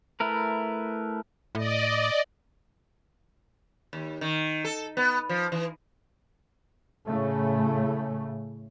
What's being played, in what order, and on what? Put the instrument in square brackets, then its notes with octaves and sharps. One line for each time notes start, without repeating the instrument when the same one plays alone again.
[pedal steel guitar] A3 E4 A#4 B4
[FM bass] A2 [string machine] D5 D#5
[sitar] D#2
D#3
A4
B3
F3
E3
[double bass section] A2 C#3 A3